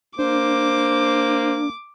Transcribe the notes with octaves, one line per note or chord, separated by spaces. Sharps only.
A#3 D4 C5 D6